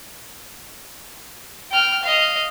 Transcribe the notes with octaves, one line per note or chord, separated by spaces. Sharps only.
G5 F6
D#5 F5